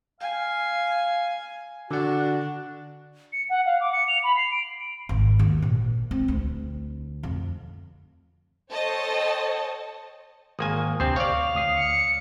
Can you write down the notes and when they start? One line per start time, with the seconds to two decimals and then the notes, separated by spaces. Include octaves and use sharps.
0.20 F5 G#5
1.91 D3 D4 F#4 F#5
3.33 C#7
3.50 F#5
3.66 F5
3.81 D6
3.92 C#7
4.08 F7
4.24 B5
4.37 C7
4.52 D7
5.09 G#1
5.39 D#2
5.62 A#1
6.11 C4
6.28 D2
7.23 F2
8.71 A4 C5 C#5 D#5 G5 A5
10.59 G#1 A#3 G#5 D#6
11.00 D2 C3 C4 C5
11.16 C#5 D5 F5
11.55 D2 D#6 C7
11.75 C#7